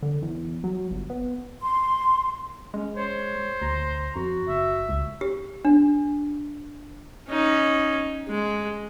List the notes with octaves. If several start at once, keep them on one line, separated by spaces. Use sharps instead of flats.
D3
E2
F#3
G1
B3
C6
G#3 C#4
C5 C#5
D2 A#5
F2 F#4
F#1 E5
C#2
G4
D4
C#4 D#4
G#3